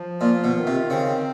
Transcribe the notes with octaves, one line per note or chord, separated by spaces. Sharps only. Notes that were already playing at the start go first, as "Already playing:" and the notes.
Already playing: F3
A#2 F4
B2
D#3
C3
C#3 C4